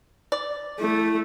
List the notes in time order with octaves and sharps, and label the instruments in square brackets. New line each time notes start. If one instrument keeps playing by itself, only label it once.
[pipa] D5
[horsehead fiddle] A3 [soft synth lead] E4